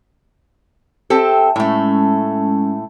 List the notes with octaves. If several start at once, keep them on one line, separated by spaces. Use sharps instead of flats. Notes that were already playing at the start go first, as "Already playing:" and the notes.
C4 G4 A4 E5 G5
A2 G#3 A3 C#4